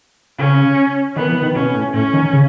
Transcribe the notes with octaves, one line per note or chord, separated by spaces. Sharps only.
C#3 C#4
D#3 B3
E3
D#3
B2 C#4
A2
A2 C#4
D#3
C#3